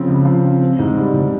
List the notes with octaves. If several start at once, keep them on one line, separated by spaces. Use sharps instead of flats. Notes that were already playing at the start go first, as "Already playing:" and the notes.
Already playing: C#3 F3 C4
C#2
F3
C4
C4
G#2
G3
G#2